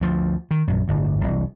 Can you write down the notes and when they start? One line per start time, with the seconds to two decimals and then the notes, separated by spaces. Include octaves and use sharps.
0.01 D2 F3
0.51 D#3
0.68 A#1 F#2
0.88 D1 G1 D2
1.21 E1 C2